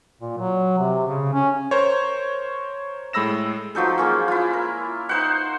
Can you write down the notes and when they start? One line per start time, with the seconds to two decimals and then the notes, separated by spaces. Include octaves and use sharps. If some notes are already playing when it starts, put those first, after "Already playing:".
0.21 A#2
0.38 F#3
0.78 C3
1.07 C#3
1.33 C#4
1.71 A#4 C5 C#5
3.13 A2 G#3 B5 E6 A#6 E7
3.75 F3 F#3 D#4 A4
3.98 G#3 A#3 C#4
4.28 E4 F4
4.53 A#4
5.09 D#4 C5 F#5